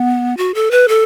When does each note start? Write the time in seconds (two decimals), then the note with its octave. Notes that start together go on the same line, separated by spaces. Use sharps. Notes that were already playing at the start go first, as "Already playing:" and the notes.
Already playing: B3
0.37 F#4
0.54 A4
0.71 B4
0.88 A4